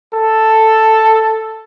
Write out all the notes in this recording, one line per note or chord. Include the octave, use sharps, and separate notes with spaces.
A4